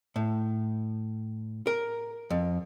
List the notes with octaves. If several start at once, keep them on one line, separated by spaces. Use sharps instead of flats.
A2
A#4
F2